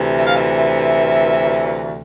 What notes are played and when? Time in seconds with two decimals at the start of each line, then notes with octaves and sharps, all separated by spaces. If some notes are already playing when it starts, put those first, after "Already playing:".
Already playing: D2 C3 E3
0.16 E5
0.26 F5
0.35 E5